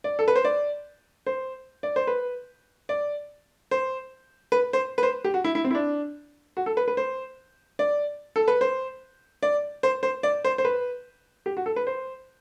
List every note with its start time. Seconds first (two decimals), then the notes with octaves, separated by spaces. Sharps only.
0.04 D5
0.19 A4
0.28 B4
0.36 C5
0.45 D5
1.26 C5
1.83 D5
1.96 C5
2.07 B4
2.89 D5
3.71 C5
4.52 B4
4.73 C5
4.98 B4
5.03 C5
5.24 G4
5.34 F#4
5.44 E4
5.55 E4
5.64 C4
5.71 E4
5.75 D4
6.57 F#4
6.66 A4
6.77 B4
6.88 B4
6.97 C5
7.79 D5
8.36 A4
8.48 B4
8.61 C5
9.43 D5
9.83 C5
10.03 C5
10.23 D5
10.45 C5
10.58 C5
10.65 B4
11.46 G4
11.57 F#4
11.66 A4
11.76 B4
11.87 C5